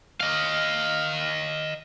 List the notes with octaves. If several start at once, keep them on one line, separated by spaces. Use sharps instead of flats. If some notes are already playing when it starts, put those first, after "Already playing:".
D#5 F5